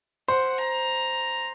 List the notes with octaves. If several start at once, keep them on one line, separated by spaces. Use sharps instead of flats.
C5 F#5
A#5